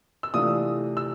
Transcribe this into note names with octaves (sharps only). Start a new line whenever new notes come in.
E6
C3 E3 A3 D4 F4 D#6
E6